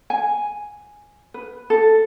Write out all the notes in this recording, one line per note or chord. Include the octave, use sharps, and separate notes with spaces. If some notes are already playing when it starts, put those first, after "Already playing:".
G#5
B4
A4